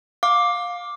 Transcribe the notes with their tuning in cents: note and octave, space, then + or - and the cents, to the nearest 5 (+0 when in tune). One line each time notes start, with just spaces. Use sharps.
F5 +20 D6 +0